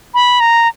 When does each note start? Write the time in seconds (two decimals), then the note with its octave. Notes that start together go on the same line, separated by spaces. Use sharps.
0.14 B5
0.40 A#5